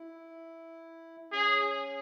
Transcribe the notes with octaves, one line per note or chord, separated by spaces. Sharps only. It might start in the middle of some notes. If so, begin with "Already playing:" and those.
Already playing: E4
C#4 G#4